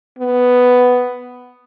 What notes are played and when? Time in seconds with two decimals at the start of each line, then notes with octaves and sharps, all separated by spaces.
0.19 B3